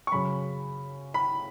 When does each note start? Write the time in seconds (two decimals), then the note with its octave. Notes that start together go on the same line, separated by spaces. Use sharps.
0.07 C#6
0.12 F#2 C#3 B5
1.14 B5